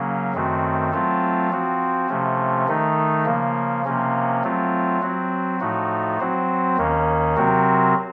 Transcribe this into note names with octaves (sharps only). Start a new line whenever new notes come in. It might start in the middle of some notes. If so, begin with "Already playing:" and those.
Already playing: C#3 F#3 A#3 C#4
F#2 D#3 A3 C4 F#4
F#3 A3 C4 F4 A4
F3 C4 F#4
C3 F3 A3 C#4
D#3 A3 D#4
C#3 F3 A#3
C3 F3 A#3 C#4
F#3 A3 C4 F4
F#3 C4 F#4
A2 F3 A3 D#4 F#4
F#3 C4 F#4 C5
D#2 D#3 A#3 C#4
C3 F#3 C4 F#4 A#4